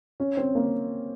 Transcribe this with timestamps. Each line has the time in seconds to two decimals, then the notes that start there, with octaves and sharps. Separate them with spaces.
0.20 C#4
0.37 C4
0.55 A#3